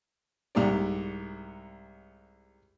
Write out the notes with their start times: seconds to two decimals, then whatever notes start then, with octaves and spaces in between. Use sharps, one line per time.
0.55 C2 G#2 G4 D5